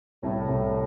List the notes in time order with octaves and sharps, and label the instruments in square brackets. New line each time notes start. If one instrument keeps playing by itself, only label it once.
[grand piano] C2 [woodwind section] A2
[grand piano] C2